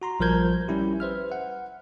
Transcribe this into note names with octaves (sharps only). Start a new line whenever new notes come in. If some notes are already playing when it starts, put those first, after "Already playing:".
F#4 A#5 C6
A#1 F3 G3 A#4 G6 G#6
G3 C#4 E4 G4
B4 C5 E5 F6
F#5